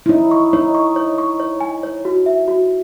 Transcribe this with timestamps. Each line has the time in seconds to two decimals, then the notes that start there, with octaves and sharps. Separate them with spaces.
0.06 E4
0.09 D#4 C#5
0.31 C#6
0.53 D#4 C#5
0.75 C#6
0.96 C#5
1.18 C#6
1.40 C#5
1.61 G#5
1.83 C#5
2.05 F#4
2.26 E5
2.48 F#4